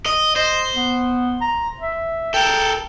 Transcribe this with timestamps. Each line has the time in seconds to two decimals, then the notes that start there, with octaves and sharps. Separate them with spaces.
0.06 D#5
0.36 C5 D#5
0.75 B3
1.41 A#5
1.80 E5
2.34 A4 A#4 G5